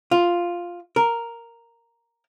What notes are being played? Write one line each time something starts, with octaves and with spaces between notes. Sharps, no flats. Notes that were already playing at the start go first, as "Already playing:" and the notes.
F4
A#4